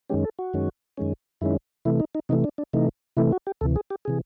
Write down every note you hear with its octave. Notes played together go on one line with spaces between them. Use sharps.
F#2 D#3 G#3 C#4 G4
A4
F#4
F#2 D#3 G#3 C#4
F#2 D#3 G#3 C#4
F#2 D#3 G#3 C#4 E4
C3 E3 A3 E4
D#4
D#4
C3 E3 A3 D#4
D4
D4
C3 E3 A3 D#4
C3 E3 A3 E4
F#4
G4
D2 C3 E3 A4
G#4
G4
C3 E3 G#4